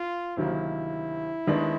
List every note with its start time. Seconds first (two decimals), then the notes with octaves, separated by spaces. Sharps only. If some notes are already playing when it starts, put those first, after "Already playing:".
Already playing: F4
0.37 D2 C3 D#3 F#3 A#3 E4
1.47 D#2 D#3 G#3 B3 D4